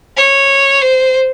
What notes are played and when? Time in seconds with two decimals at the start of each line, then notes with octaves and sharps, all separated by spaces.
0.17 C#5
0.82 C5